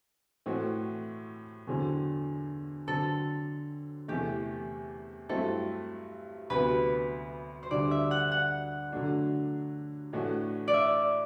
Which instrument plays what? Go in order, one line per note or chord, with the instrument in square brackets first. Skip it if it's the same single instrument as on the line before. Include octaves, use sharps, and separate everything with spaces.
[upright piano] A2 E3 A3 C4 F#4
E2 D3 F#3 C4
[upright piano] D3 F#3 C4 [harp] A4
[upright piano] E2 C3 E3 A3 [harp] G4
[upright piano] G2 F#3 A3 C4 E4 [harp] A4
[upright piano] D2 C3 F#3 B3 F#4 [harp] B4
[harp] C5
[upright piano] D2 D3 G3 D4 F#4 [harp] D5
[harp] E5
F#5
F#5
[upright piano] D3 F#3 A3 D4
A2 E3 A3 D4 F#4
[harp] D5
E5